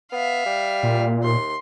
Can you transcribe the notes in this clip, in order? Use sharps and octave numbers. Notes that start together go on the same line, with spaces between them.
B3 E5 F5
G3
A#2
D#2 C6